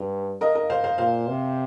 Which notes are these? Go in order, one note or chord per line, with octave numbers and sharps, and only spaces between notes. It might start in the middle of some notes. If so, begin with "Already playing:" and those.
Already playing: G2
A#4 D#5
A#4 D#5
C5 F5
C5 F5
A#2 C5 F5
C3